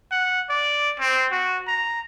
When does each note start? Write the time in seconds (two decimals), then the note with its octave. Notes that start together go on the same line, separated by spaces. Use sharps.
0.11 F#5
0.49 D5
1.00 C4
1.31 F#4
1.68 A#5